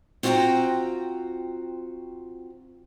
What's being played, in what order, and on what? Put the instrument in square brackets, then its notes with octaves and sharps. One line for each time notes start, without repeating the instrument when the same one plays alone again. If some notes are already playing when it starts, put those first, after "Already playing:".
[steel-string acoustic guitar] C4 F4 F#4 F5 G5 A#5